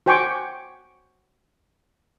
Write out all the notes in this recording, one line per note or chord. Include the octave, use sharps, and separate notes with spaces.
F#4 C5 G5 G#5 C#6 D6